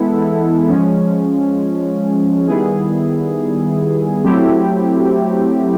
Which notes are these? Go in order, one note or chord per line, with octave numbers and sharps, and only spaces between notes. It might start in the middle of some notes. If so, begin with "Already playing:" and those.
Already playing: E3 G#3 B3 E4 A4
F3 G#3 C#4
D#3 G3 B3 E4 G#4
F#3 A3 C4 E4 G4